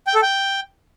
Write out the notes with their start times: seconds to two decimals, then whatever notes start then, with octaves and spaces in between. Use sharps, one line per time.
0.07 G5
0.15 A4
0.22 G5